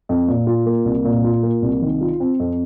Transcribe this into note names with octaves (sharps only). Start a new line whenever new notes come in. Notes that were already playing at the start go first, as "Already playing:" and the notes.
F2
A#2
F4
A#3
C2
A#2
F4
A#3
C2
D#3
F4
C4
F2